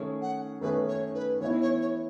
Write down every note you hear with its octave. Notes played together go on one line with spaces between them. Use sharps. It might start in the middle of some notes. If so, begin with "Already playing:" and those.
Already playing: D#3 A3 C#4 G#4
F#5
D#3 A3 C#4 G#4 B4
C#5
B4
E3 B3 E4 C#5
C#5
C#5